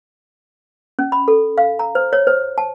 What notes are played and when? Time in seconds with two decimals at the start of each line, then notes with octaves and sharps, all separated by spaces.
0.99 C#4
1.12 B5
1.28 A4
1.58 F5
1.79 A#5
1.95 C5
2.13 C#5
2.27 C5
2.58 A5